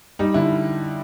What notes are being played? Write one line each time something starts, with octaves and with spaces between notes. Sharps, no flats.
G3 D#4
D3 E4